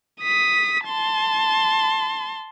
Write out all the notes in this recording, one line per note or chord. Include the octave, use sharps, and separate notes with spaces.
D#6 B6
A5 C6